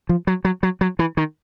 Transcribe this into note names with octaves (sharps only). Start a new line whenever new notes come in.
F3
F#3
F#3
F#3
F#3
E3
D#3